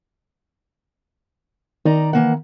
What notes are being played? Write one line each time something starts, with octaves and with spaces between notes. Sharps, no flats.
D#3 D#4 D5 A#5
E3 A#3 F#5